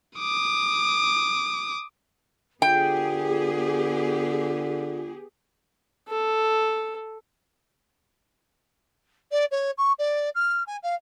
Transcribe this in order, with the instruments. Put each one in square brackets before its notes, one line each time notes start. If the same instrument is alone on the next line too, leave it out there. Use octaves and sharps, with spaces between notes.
[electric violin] D6 D#6
[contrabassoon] D3 [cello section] B3 G4 G#4 [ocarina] F4 [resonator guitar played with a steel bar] G5
[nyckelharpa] A4
[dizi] D5
C#5
C#6
D5
F6
G#5
F5